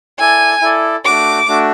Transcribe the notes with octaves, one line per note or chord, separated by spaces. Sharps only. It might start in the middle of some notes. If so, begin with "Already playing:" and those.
E4 A4 D5 G#5
E4 A4 D5
A3 D4 F#4 D6
A3 D4 F#4